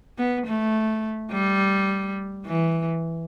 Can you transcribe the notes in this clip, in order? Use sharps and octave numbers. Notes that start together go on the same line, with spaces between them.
B3
A3
G3
E3